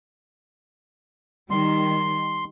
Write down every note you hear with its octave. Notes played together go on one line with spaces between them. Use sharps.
D#3 G3 C6